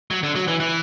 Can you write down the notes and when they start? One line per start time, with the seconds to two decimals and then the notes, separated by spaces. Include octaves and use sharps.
0.11 F#3
0.23 D3
0.36 F#3
0.48 E3
0.60 E3